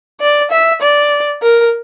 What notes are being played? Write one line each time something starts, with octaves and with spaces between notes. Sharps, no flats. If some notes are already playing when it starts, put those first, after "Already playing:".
D5
E5
D5
A#4